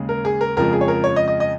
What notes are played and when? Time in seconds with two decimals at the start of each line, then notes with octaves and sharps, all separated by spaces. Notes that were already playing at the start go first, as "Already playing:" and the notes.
Already playing: D#2 C#3 G#3
0.09 A#4
0.25 G#4
0.41 A#4
0.57 F2 C#3 F3 G#3 A#4
0.73 G#4
0.81 C#5
0.88 A#4
1.04 C#5
1.16 D#5
1.28 D#5
1.40 D#5